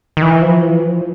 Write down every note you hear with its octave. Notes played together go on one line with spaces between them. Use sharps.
D#3
E3
F3
E3
F3